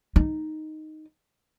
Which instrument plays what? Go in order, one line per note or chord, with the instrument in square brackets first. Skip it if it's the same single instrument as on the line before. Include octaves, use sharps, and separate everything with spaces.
[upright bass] D#4